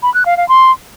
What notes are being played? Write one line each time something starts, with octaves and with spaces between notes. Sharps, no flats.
B5
F#6
F5
F5
C6